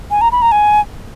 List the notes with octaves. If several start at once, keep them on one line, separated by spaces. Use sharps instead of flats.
G#5
A#5
B5
A#5
G#5